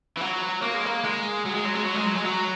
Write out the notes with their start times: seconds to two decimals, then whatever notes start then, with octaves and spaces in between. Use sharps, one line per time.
0.17 E3
0.21 F#3
0.62 A#3
0.75 G#3
0.86 A#3
1.04 G#3
1.46 F#3
1.55 G#3
1.65 F#3
1.75 G#3
1.84 F#3
1.95 G#3
2.05 F#3
2.15 G#3
2.25 F#3